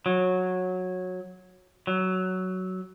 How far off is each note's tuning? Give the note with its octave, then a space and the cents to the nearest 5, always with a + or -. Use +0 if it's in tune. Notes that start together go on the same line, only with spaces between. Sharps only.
F#3 -15
F#3 +10